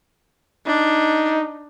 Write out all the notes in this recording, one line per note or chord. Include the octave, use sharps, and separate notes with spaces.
D4 D#4